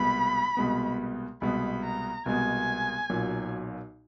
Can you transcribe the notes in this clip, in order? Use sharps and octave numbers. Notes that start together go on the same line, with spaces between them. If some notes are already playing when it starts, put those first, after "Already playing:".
Already playing: C2 B2 G#3 B3 B5
C2 B2 G#3 B3
C2 B2 G#3 B3 B5
A#5
C2 B2 G#3 B3 G#5
B1 A#2 F#3